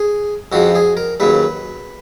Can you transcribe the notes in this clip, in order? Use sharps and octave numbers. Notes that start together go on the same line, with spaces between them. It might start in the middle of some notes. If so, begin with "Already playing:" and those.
Already playing: G#4
F2 C#3 F3 F#4
G#4
A#4
D#2 C#3 F#3 B4